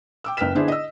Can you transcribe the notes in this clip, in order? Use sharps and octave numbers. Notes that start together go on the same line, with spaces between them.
G5 D6 E6
F#1 B4 G5 F6 B6 E7
D3 B3 D4 E4 G#4 C5
D#5 E6